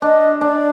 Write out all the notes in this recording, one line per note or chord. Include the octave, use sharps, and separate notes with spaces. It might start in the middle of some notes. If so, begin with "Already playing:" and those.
D4 D#5
D4 D5